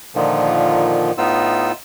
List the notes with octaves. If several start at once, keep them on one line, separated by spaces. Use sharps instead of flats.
A#2 D3 D#3 F3
A2 B3 D#4 F4 E6